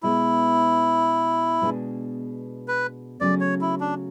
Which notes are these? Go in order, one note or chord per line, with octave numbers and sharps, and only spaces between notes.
B2 G#3 B3 E4
B2 G#3 D4 G#4
B4
C#3 F#3 A3 C#4 D5
C#5
E4
D4